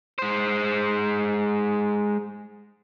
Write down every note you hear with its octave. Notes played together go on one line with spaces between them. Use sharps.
G#3 C5